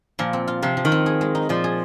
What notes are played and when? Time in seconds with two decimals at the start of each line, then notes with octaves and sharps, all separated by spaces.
0.19 A#2 F3
0.33 C4
0.48 F4
0.63 C3 F3
0.77 F3
0.85 D#3
0.92 C4
1.06 G#4
1.21 G#3
1.35 D#4
1.49 A#2 F3
1.64 G#4